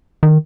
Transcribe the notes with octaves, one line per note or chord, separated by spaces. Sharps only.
D#3